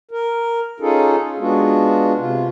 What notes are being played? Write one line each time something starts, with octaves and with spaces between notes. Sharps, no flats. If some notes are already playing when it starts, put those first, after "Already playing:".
A#4
C#4 D#4 F4 G#4 A4
G#3 B3 D4 F4 F#4
C3 F4